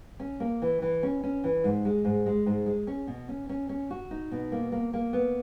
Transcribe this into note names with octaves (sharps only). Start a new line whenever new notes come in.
C#4
A#3
E3
E3
C#4
C#4
E3
G#2
G#3
G#2
G#3
G#2
G#3
C#4
B2
C#4
C#4
C#4
F#4
D#4
B2
A#3
A#3
A#3
B3